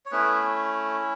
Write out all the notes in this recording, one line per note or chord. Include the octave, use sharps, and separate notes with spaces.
C#5
A3 B3 C#4 E4 B4